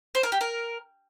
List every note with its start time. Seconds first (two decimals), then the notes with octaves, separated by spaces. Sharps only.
0.15 C5
0.23 A#4
0.32 G4
0.41 A#4